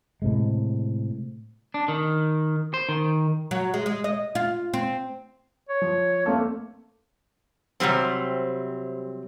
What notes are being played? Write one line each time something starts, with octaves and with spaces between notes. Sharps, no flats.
A2 C3 G#3
D4
D#3
C5
D#3
F#3
G#3
G#3
D#5
F4
C4
C#5
F3
A3 A#3 C4 A4
C3 F#3 G3 C4